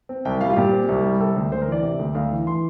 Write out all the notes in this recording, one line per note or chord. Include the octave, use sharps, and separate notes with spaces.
C4
C2 G5
G3 F5
F4
A#2 G4
C4
C2
G3
C3 A4
D2
D2 C5
A#4
E3
D5
C3
D2
D2 F5
E3
E3 C6